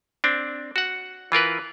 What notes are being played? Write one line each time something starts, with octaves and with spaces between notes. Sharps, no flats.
C4 D4
F#4 F#5
E3 F4 A#4 B4